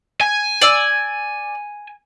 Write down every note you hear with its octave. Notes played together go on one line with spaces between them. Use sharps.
G#5
D5 E6